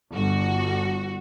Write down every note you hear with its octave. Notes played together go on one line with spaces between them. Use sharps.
G1 F#4